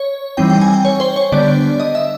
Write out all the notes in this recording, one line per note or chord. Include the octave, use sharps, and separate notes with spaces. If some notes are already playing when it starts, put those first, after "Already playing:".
Already playing: C#5
E3 G3 C4 D#4 G5
G5
G#5
G5
C#5
C5
C#5
D3 G3 B3 D4 D5
D#5
E5